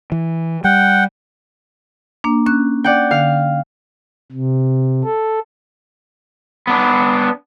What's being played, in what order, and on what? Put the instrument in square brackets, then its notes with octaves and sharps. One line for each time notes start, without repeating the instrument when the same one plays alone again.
[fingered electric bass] E3
[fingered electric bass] G3 [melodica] F#5 G5
[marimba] A#3 D4
C#4 F#6
[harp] D5 F#5 G5
[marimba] D3 [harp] F5
[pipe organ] C3
A4
[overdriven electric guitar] B3 D4